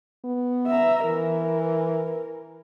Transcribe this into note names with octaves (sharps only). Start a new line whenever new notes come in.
B3
E5 A#5
E3 A#4